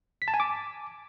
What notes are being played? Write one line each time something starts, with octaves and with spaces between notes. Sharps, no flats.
B6
A5
G#5
D6